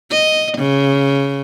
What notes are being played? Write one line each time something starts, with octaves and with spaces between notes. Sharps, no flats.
D#5
C#3